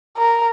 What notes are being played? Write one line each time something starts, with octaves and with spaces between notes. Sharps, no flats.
A#4